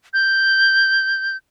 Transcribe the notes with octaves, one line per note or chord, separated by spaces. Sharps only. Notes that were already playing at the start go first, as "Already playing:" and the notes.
G6